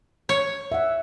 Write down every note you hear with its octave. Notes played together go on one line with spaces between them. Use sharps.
C#5
E5 F#5